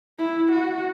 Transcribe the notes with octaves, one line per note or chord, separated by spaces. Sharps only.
E4
F#4